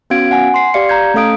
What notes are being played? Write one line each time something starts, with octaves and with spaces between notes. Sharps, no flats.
B3 C#4 F#4 F5 G#6 D7
F#5 G#5
C6 C7
G4 D5 F5 C#7
A#5 G6 G#6
A3 C#4 A4 F5 D#6 D7